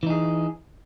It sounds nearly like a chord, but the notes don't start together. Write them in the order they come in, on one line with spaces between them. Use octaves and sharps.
E3 D#4 G#4